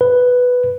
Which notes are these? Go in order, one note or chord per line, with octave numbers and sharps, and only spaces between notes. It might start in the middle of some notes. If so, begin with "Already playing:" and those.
B4